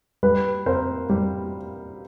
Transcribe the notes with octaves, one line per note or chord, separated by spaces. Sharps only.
G3 B4
C4 A#4 C5
G3